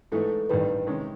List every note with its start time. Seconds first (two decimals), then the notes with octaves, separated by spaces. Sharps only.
0.12 G#2 E3 A3 A4
0.50 A1 G2 D#3 G3 B4
0.87 C3 D#3 G#3 C#4